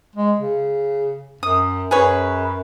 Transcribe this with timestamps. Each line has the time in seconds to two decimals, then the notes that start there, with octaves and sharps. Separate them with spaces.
0.16 G#3
0.40 C#3
1.43 F#2 D#6
1.91 F#2 G#4 B4 C#5